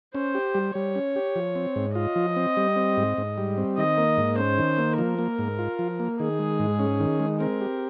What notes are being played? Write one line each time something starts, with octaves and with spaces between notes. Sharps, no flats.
C#4 C5
G4
G3
G3 C#5
C#4
G4
F3
C4
G#2
F4 D#5
F3
C4
G3
C4
G#2
G#2
G3
C4
D#3 D#5
A#3
G#2
C#4 C5
D#3
A#3
F3 A#4
A#3
G#2
F4
F3
A#3
D#3 G#4
G#3
G#2
C#4
D#3
G#3
C4 A#4
G4